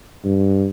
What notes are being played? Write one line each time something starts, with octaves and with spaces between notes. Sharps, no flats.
G2